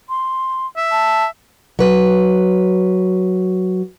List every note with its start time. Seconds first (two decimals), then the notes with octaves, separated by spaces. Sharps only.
0.09 C6
0.77 E5
0.91 A5
1.79 F#3 B4